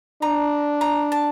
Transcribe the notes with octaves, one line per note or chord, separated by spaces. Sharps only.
D4 A#5
A#5
A5